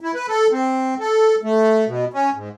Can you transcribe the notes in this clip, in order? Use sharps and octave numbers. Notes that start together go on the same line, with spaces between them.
E4
B4
A4
C4
A4
A3
B2
C#4
G#2